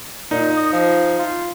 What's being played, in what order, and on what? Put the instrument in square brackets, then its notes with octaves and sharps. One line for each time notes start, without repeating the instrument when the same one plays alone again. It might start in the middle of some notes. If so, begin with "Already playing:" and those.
[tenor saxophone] A#2 [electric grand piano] D#4
[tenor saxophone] D#5
F3
F4